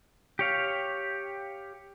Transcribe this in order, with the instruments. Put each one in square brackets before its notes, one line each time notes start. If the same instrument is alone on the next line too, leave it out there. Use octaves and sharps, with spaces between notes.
[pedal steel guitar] G4 C#5 F5